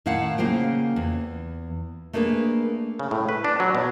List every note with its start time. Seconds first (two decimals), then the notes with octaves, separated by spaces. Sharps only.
0.06 A2 D#3 E4 F5 F#5 A5
0.38 C#3 A#3 F4 C5 G5
0.96 E2
2.13 A3 A#3 D4 G#4 B4
2.99 C#3
3.11 A2
3.29 B4
3.44 D4
3.60 F#3
3.75 B2